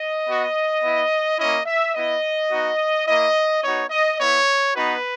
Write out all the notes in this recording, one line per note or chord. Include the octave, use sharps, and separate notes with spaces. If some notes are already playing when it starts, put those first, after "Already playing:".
Already playing: D#5
B3 F#4
B3 E4
A#3 C#4 E4 D#5
E5
B3 E4 D#5
B3 D#4 F#4
A#3 E4 D#5
B3 D#4 F#4 C#5
D#5
B3 E4 C#5
B3 D#4 F#4 B4